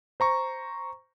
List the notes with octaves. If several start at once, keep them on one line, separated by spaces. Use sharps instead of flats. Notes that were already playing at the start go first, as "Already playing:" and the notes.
C5 A#5 C#6